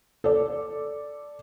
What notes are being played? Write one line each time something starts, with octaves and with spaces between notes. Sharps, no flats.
A4 D5